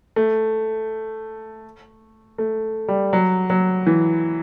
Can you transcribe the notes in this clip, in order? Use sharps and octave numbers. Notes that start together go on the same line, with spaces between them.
A3
A3
G3
F#3
F#3
E3